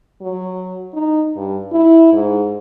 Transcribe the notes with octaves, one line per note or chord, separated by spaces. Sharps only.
F#3
D#4
G2
E4
G#2